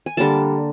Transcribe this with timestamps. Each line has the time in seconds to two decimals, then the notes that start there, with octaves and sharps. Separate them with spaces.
0.06 G#5
0.17 D3 G3 A#3 A5